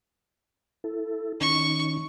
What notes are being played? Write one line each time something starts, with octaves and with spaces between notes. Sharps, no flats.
E4 A4
D#3 C#4 D#4 C#6